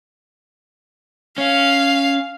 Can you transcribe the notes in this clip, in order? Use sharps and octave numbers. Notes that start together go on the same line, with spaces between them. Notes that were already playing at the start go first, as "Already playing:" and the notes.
C#4 F5